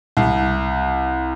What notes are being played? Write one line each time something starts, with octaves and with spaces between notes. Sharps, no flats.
C2